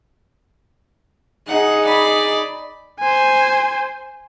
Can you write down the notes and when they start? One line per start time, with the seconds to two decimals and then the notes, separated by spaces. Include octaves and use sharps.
1.47 D#4 G#4 F#5
1.85 D5 B5
3.00 C5 G#5